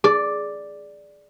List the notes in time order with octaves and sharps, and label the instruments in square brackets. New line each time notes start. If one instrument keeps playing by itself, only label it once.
[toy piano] G#4 [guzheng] D5